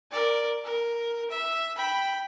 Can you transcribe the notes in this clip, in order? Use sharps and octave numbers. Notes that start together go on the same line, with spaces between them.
A#4 D5
A#4
E5
G5 B5